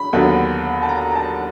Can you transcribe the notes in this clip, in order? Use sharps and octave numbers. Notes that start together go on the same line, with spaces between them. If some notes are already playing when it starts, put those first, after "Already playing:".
Already playing: B5
D#2 D3 F#3 B3
A5
A#5
A#5
A5